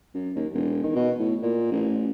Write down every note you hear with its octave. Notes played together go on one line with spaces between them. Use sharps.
F#2
D#2
E1
D#3
B2
A2
A#2
A1